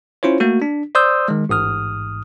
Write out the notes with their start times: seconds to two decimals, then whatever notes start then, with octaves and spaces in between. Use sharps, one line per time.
0.23 C#4 E4 F4 C5 C#5
0.40 A3 A#3 F#4
0.62 D4
0.95 C5 D5 C6 D#6 E6 G6
1.28 D#3 G#3
1.49 A1 G#2 D#6 F6